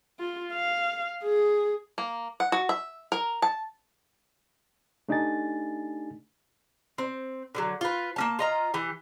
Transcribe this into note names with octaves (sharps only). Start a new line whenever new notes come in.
F4
F5
G#4
A#3
F#5
F#4
E5
A#4
A5
A3 D4 D#4 G4 G#5 A6
C4
D3 D#3 F#3
F4 B4
A#3 C#4 A5
F4 D#5 A#5
E3 G4